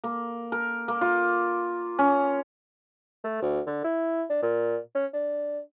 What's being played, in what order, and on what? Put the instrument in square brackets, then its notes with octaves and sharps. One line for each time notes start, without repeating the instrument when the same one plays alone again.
[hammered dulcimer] A#3
A#4
A#3
F4
C#4
[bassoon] A3
D2
D3
E4
D4
A#2
C#4
D4